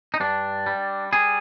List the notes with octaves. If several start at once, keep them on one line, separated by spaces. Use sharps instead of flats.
D#4
G2 D4
G3
G3 G#4